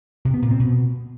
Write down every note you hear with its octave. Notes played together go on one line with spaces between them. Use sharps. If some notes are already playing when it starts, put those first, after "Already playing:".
C3
B3
A#2
C4
B2